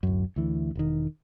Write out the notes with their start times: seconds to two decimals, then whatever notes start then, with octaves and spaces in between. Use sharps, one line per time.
0.03 D1 F#2
0.36 D2 E3
0.75 E1 D#3